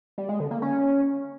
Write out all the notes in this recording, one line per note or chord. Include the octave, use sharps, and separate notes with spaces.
G3
G#3
D3
A#3
C#4